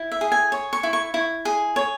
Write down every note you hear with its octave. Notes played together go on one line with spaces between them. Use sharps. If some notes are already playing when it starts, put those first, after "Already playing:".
Already playing: E4
E5
G#4
G#5
C#5
C#6
E4
C#6
E4
G#4
C#5